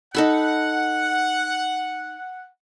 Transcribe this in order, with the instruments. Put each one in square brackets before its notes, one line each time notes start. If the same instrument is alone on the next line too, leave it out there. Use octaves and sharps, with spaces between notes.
[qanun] D#4 A4 B5 [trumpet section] F#5